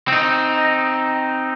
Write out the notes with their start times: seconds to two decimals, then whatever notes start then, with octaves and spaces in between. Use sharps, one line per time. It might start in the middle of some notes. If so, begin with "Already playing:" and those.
0.08 C4 D#4